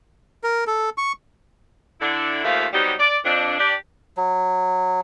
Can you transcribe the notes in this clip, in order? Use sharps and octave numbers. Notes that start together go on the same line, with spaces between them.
A#4
A4
C#6
D3 D4 E4
D#2 F3 A3 F4 F5
F#3 G3 B3 C4 D#4 G4
D5
F2 D4
D4 G4 D5
F#3